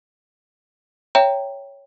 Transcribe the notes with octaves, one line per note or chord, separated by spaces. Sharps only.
C#5 E5 G5 A#5